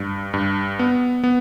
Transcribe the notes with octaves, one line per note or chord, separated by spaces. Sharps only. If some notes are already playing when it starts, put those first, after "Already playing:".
Already playing: G2
G2
B3
B3